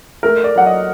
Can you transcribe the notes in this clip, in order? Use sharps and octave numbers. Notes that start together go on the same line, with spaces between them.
A3 A#4
D5
F#3 F#5
D#5